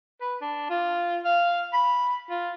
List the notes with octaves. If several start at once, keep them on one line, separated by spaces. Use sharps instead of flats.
B4
D4
F4
F5
B5
F4